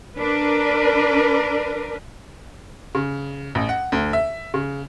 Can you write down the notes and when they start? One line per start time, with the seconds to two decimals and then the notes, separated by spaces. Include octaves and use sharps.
0.17 D4 A#4 B4
2.95 C#3
3.55 A1
3.69 F#5
3.92 D2
4.13 E5
4.54 C#3